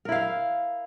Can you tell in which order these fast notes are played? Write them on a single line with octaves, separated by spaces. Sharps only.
A#4 E4 F5